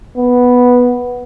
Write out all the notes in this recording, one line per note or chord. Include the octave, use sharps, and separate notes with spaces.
B3